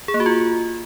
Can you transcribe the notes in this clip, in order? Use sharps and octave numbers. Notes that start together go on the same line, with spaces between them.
G#4
A#3
F#4
F4